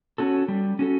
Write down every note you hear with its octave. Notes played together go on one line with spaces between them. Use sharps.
C#4 F#4 A4
G3
C#4 F#4 A4